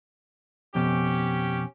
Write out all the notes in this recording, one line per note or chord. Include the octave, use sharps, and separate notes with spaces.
F2 B2 C#4 G4